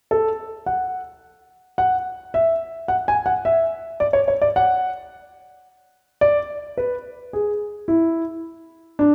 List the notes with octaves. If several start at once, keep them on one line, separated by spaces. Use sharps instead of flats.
A4
F#5
F#5
E5
F#5
G#5
F#5
E5
D5
C#5
C#5
D5
F#5
D5
B4
G#4
E4
D4